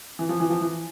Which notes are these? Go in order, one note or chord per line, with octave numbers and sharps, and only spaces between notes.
E3
F3
E3
F3
E3